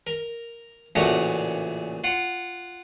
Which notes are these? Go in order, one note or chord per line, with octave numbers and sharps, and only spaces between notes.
A#4
A1 A#2 C#3 A3 F#4 A#5
F4 F#5